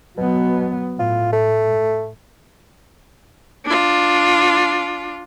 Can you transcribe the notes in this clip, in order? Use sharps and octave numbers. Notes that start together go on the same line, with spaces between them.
B2 F#3 B3
A2 F4
A3
D4 F4